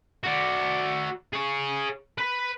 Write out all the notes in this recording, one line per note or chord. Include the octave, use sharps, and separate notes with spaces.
F#4 D5
G#4 C#5
B4 B5